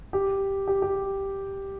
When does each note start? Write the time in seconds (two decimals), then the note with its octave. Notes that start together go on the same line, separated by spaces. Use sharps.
0.13 G4
0.67 G4
0.82 G4